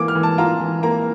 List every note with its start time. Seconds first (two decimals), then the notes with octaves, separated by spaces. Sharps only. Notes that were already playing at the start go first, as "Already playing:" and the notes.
Already playing: E3 A#3 D6
0.08 F6
0.15 E3
0.23 A5
0.38 F4 A#5
0.60 E3
0.83 A#3 A#5